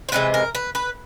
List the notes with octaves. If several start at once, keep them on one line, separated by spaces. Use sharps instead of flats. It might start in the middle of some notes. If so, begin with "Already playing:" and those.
C5
C3 E3 G#3 B4
A#4
B4
B4